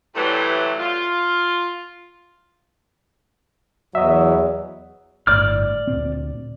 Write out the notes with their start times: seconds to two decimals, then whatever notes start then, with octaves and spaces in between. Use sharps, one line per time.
0.15 A2 C3 E3 F#3 G3 A3
0.80 F4
3.95 E2 F#3 D#5 E5
5.27 G1 A2 D5 D6 F6
5.87 D2 A#2 C4